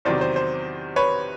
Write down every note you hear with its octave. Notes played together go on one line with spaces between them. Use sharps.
E2 C3 D#3 F#3 C5 D5
C5
C5
B4 C#5